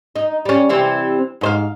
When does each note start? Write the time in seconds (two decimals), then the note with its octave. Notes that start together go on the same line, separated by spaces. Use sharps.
0.16 D#4
0.45 G3 C#4
0.69 C3 E3 C4
1.41 G#2 C5 F5